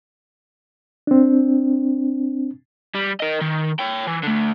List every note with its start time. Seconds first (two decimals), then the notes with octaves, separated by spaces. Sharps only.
1.07 C4 D4
2.95 G3
3.20 A#4 D#5
3.41 D#3
3.79 C#5 G5
4.07 E3
4.23 D3 A3